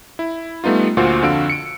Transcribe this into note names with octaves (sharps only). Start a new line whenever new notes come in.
E4
G3 A3 B3 D#4 F4
D2 A#2 F4 F#4 C5 F5
F2 D3 F#4 F5 E6 D7
C#7 D7